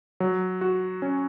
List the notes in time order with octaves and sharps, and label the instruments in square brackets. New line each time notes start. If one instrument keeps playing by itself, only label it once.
[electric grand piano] F#3
F#4
C#4